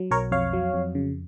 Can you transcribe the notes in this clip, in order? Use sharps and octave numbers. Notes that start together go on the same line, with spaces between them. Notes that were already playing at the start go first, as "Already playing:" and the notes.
Already playing: F#3
B1 A#4 C#5
F2 C#5 F5
F#3
F2
C#3